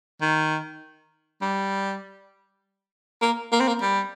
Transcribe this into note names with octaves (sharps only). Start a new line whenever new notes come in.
D#3
G3
A#3
A#3
C4
A#3
G3